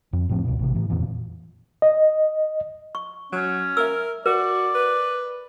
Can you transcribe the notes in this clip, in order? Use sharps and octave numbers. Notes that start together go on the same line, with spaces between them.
F2
A2 F3 C4
C#2 B2
A1 C3
A2 E3
F2 A#2 E3
D#5
C#6
F#3 C#4
A#4 E5 E6
F#4 A#4 D5
B4